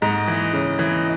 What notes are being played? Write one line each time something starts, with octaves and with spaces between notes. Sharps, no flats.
G#2 D#5
E3
C#3
E3